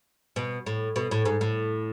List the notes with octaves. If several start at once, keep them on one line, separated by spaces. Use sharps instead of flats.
B2
A2
B2
A2
G#2
A2